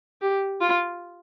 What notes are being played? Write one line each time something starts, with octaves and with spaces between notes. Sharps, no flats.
G4
F4